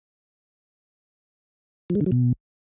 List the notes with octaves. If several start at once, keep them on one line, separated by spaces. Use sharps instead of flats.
F3
G#3
D3
F#3
B2